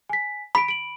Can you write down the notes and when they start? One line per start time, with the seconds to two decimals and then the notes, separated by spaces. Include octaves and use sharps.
0.09 G#5 B6
0.55 B5 B6 D7
0.68 D7 F#7